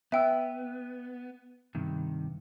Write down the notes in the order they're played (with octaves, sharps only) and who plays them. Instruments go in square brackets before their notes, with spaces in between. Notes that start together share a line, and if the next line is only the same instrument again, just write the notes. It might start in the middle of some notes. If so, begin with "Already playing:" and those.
[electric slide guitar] B3 [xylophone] E5 G5 E6
[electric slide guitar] G2 C3 D#3